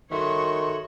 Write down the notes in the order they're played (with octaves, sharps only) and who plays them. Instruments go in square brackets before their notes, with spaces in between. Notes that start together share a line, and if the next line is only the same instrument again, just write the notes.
[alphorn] D#3 [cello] F#4 C#5 [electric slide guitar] G#4 A4 E5 [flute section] C6 C#6